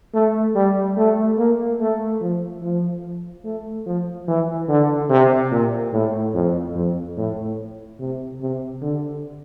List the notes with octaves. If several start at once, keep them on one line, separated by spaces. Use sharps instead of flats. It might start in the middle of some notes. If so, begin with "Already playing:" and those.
A3
G3
A3
A#3
A3
F3
F3
A3
F3
E3
D3
C3
A#2
A2
F2
F2
A2
C3
C3
D3